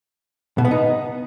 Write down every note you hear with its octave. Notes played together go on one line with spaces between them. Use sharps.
B2
B3
D#4